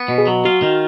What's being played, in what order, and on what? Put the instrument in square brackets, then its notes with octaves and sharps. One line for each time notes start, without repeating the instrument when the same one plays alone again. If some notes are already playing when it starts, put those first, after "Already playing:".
Already playing: [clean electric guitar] B3
B2
[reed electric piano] G#4
[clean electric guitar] F#3
[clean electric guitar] F4 [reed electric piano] F#4
[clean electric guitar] D#3